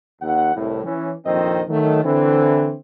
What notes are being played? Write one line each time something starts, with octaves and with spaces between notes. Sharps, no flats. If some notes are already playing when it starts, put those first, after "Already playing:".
D#2 F#5
C2 A2
E3 C#4
A#1 F2 D#3 C4 C5 D#5
D#3 F#3 A3
D3 E3 C4